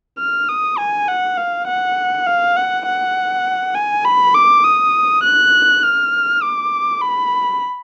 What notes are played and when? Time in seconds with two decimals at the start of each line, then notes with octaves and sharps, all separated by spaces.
0.19 F6
0.49 D#6
0.78 G#5
1.08 F#5
1.38 F5
1.67 F#5
2.27 F5
2.57 F#5
2.87 F#5
3.75 G#5
4.05 B5
4.35 D6
4.64 D#6
5.24 F#6
5.83 F6
6.43 D6
7.02 B5